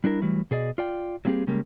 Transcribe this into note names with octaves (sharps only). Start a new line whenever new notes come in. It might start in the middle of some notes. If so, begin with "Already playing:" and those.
G3 D4 E4 A#4
E3 F#3 G3 A3
B2 G#4 D5 D#5
F4 D5 G5
F#3 G3 A#3 C4 G4 G#4
C#3 G3 G#3 A#3